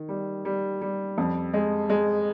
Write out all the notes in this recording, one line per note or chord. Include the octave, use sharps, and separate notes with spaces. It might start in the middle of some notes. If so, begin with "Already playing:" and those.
Already playing: D#3
G3
G3
G3
F2
G#3
G#3